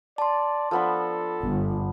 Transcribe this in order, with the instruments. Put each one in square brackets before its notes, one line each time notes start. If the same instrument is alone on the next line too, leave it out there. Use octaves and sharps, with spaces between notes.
[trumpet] D5 [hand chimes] A5 C6
[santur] F3 B3 D4 [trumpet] A4
[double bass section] G1